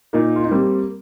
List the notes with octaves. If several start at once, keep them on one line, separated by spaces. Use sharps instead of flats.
A#2 A#3 D#4
F4
D#4
G3 A#3 C4